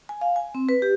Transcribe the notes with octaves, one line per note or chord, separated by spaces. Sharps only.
G#5
F5
G#5
C4
B4
G4